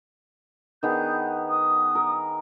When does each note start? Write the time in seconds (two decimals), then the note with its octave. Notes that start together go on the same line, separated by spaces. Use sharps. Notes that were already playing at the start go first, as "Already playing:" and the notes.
0.83 D#3 B3 G#4 G6
1.50 D#6
1.95 A#4